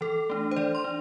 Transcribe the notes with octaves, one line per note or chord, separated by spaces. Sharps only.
E3 A4
A3 D4
C5
E3 D5
C6
D4